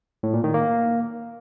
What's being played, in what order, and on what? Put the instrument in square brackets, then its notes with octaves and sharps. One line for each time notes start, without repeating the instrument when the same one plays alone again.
[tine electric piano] A2
A#2
D#3
A#3